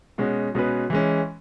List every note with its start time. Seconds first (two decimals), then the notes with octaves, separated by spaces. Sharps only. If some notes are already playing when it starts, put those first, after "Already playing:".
0.18 B2 G#3 C#4 F#4
0.55 B2 G#3 C#4 G#4 B4
0.90 E3 G#3 C#4